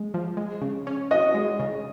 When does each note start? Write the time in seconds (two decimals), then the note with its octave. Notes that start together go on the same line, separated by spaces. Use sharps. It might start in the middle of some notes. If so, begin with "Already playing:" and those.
Already playing: G#3
0.14 F3
0.37 G#3
0.61 C#3
0.87 C#4
1.11 F#4 D#5
1.34 G#3
1.60 C#3